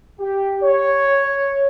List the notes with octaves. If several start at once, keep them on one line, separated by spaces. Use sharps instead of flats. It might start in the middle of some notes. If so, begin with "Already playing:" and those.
G4
C#5